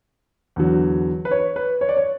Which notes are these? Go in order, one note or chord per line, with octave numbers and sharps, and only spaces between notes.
E2 D3 F#3
B4
C#5
B4
C#5
D5
C#5